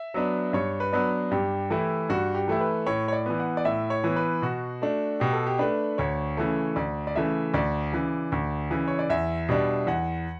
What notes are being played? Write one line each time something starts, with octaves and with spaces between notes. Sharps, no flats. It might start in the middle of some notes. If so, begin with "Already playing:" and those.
Already playing: E5
F#3 B3 D4
G2 C#5
B4
F#3 B3 D4
G2 G4
E3 A3 E4
G2 F#4
G4
E3 A3 E4
B4
A2 C#5
C#5
D5
E3 B3
F#5
D5
A2 E5
C#5
E3 B3
B4
B2 F#4
A3 D4
B2 G4
A4
G4
A3 D4 B4
D2 C#5
C#3 E3 A3
D2 D5
D5
C#3 E3 A3 E5
D2 D5
C#3 E3
D2
C#3 E3
C#5
D5
E2 E5
B2 G3 D4
E2 F#5